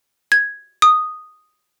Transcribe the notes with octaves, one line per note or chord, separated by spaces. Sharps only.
G#6
D#6